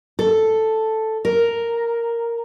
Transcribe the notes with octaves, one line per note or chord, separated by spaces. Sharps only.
A4
A#4